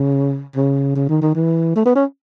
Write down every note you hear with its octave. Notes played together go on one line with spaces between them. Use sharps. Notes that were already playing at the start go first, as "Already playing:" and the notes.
Already playing: C#3
C#3
C#3
D#3
D#3
E3
A3
B3
C#4